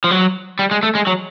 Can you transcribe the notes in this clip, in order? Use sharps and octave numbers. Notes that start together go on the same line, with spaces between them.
F3
F#3
G3
G#3
A3
G#3
F#3